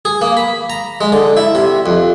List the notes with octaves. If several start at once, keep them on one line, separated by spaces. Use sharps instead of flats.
G#4
A#3
B5
A#5
G#3
D3
E4
C3
F2